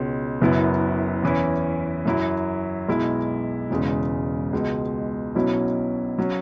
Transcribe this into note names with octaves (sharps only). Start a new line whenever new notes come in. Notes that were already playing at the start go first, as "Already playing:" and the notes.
Already playing: C#2 B2 G#3 C#4
F#1 F#2 F#3 B3 E4
E2 E3 C#4 E4
F#2 F#3 E4
B1 B2 G#3 E4
E1 E2 C#3 G#3
C#2 B2 G#3
B1 B2 F#3 C#4 E4
F#3 C#4